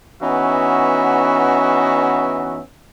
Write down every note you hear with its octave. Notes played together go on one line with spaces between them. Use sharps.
E3 B3 C#4 D#4 F#4 E5